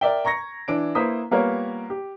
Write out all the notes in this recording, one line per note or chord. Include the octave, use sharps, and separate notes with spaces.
A#4 D5 E5 G5
A#5 C#6 G#6 A#6 C#7
E3 D4 D7
A#3 E4 B4 C5 D#6 B6
G3 A#3 B3 F4 A#4 C#5
G4